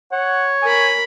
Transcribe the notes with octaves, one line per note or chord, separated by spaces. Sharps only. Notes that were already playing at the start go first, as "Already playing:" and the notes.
C#5 F#5
A#4 G#5 B5